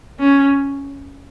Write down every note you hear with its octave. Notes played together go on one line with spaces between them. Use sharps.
C#4